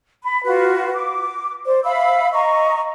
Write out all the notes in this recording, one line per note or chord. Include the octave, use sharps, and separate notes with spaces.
B5
F4 F#4 B4
D6
C5 D5
E5 F5 B5 E6
D#5 A#5 C#6